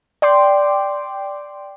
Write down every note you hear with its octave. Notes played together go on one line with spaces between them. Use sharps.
D5 G5 C6 D6